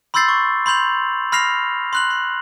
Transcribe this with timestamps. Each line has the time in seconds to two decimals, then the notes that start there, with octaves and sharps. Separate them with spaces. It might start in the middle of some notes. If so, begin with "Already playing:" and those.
0.14 B5 C6 E6 G6 A6 C7
0.29 C#6
0.66 B5 C6 G6 F7 F#7
1.32 B5 F6 A#6 C7 F7
1.93 C6 F#6 F#7
2.11 C6